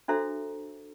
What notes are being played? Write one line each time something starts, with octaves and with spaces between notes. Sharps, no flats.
D4 F#4 A4 C5 E5 A#5